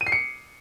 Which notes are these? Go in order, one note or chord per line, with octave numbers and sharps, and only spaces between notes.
D#7
C7
C#7